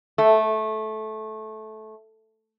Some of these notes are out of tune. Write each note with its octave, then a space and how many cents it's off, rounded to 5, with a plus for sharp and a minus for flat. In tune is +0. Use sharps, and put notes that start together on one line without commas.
A3 -15